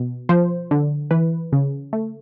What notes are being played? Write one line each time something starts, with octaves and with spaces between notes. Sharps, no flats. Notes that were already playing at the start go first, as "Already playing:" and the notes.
Already playing: B2
F3 C5
D3
E3 B4
C#3
A3